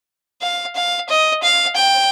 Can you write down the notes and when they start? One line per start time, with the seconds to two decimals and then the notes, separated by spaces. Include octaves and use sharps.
0.42 F5
0.76 F5
1.09 D#5
1.43 F5
1.77 G5